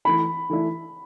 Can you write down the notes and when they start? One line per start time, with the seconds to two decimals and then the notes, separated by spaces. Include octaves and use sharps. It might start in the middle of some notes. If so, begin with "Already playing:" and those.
0.05 E3 A3 E4 B5
0.50 E3 A3 E4